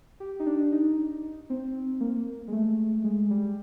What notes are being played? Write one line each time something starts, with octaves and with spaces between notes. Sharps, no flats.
G4
D#4
D4
D#4
C4
A#3
G#3
A3
G#3
G3